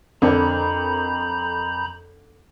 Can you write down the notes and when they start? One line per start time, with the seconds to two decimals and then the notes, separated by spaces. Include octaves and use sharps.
0.22 F2 D3 A#4 A#5 B5 G6